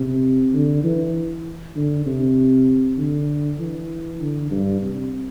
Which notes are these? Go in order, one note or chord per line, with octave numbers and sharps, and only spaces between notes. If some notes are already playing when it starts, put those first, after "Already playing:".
Already playing: C3
D3
E3
D3
C3
D3
E3
D3
G2
C3